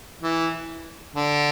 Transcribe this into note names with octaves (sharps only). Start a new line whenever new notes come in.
E3
D3